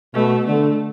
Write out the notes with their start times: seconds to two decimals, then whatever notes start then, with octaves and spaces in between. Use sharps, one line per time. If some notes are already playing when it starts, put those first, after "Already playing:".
0.15 B2 A3
0.46 D3 A3